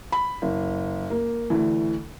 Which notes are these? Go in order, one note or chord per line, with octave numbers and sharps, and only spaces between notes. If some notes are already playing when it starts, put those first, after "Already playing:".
B5
F#1
A#3
D2 E3